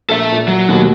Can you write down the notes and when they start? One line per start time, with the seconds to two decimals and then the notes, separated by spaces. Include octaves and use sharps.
0.09 A#1 A4 E5 E6
0.32 A#2
0.48 F#3
0.68 D#2 B2 A3